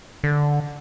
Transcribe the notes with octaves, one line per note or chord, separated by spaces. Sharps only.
D3